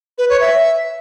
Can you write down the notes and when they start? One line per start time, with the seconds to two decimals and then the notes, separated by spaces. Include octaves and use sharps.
0.18 B4
0.29 C#5
0.41 E5